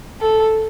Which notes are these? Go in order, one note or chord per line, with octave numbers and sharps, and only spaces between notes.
A4